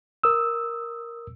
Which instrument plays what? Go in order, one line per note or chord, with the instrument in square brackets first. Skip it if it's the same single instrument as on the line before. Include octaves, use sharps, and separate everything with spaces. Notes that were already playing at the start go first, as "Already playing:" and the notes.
[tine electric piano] A#4 D#6 [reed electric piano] E6